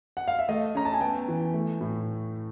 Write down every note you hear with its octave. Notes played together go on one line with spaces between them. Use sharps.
F#5
F5
E5
A3 D#5
C#4 A#5
A5
G#5
B3 G5
E3
A3
A2